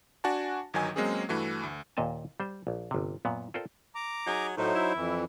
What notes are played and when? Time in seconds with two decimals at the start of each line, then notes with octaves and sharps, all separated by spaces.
0.24 D4 F#4 D5 F#5 G#5 A5
0.74 G1 D#3 F#3 D#5 G#5
0.96 F#3 G#3 A#3 C4 C#4 G#4
1.29 G2 E3 A3 F#4
1.63 D2
1.97 D#2 A#2 D#5 G#5 A5
2.40 G3 C5
2.67 A#1
2.91 G1 C3
3.25 F#2 A#2 B3
3.54 F4 A4 A#4 C5 D5 G5
3.95 A#5 D6
4.27 F#3 D#4 G#4
4.58 A2 F#3 D#4 C5
4.75 E4
4.95 F2 E3